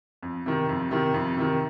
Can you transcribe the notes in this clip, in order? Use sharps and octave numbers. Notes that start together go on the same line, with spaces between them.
F2
C3 D#3
F2
C3 D#3
F2
C3 D#3